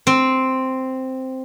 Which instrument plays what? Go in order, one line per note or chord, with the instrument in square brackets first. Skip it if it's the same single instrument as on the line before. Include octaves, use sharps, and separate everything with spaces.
[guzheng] C4